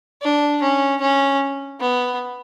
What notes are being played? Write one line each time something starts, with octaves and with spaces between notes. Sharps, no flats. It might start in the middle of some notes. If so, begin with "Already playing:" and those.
D4
C#4
C#4
B3